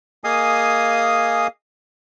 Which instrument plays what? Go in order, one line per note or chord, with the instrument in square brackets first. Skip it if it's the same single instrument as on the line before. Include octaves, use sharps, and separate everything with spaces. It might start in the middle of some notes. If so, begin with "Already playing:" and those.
[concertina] A#3 G#4 D#5 F5 G#5 D#6